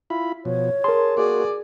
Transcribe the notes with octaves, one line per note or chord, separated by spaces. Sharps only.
E4 F4 B5
B2 F3 C#5
G#4 A#4 A5 C6
A#3 F#4 G#4 D5